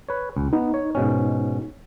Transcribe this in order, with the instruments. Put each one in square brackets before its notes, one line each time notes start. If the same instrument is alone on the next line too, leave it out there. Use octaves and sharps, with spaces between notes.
[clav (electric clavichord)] B4 C#5
C#2
[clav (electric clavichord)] B3 [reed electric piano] D#4
[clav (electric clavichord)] C#5
G#2 B2 C#4